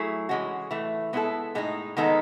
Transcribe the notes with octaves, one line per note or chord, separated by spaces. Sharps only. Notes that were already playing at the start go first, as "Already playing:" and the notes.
Already playing: F#3 A3 E4 G#4
E3 G#3 C#4 F#4
A2 E3 A3
G#3 B3 E4 A4
A2 G#3 D#4
D#3 G#3 B3 D#4 A4